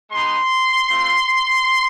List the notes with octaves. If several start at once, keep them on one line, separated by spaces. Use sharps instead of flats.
G#3 B3 D#4 C6
A3 C4 F4